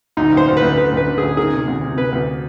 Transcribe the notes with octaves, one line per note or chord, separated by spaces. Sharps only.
D2 D#4
D2 C5
D2
B4
D2
D3 B4
D2 B4
D3
D2 G#4
D#3 G#4
C3
D2
C3
C3 B4
D2